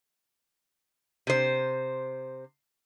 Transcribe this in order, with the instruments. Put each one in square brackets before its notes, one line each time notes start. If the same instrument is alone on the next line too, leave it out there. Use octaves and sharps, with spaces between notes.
[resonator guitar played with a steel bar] C3 C5